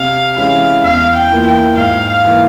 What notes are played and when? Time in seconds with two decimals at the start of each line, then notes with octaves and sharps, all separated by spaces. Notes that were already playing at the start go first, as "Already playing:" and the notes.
Already playing: C3 F5
0.36 E3 G#3 C#4 E4 F5
0.83 E2 F5
1.15 G5
1.31 E3 A#3 F4
1.46 G5
1.77 G#2 F5
2.09 F5
2.25 E3 A#3